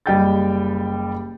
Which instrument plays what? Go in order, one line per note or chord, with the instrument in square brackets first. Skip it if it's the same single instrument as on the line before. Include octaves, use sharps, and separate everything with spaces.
[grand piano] F#1 G3 D#5 G5 G6 A6